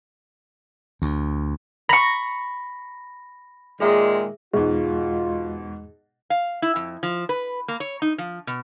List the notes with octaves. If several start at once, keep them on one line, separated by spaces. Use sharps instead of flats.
D2
A#5 B5 C#6 A#6
A#2 D#3 G#3 G#4 E5
E2 G#2 B2 G#3 F4 G#4
F5
E4
F2
F3
B4
A#3
C#5
D#4
F3
B2